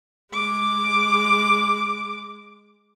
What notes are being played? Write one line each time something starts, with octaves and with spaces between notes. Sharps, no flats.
G#3 D6